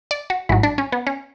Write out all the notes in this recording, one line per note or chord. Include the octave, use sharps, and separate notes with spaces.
D5
F#4
A1 G#2 F#3 E4
D4
C#4
B3
C#4